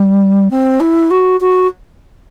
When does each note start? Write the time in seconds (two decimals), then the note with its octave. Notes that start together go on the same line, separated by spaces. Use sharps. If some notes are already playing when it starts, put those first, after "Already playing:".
Already playing: G3
0.50 C4
0.80 E4
1.10 F#4
1.40 F#4